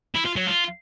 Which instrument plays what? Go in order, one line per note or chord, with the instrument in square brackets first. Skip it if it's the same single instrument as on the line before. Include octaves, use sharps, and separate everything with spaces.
[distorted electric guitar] E4
F4
F#3
F4